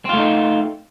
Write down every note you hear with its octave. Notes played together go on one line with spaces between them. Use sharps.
A3 C4 D#4 F4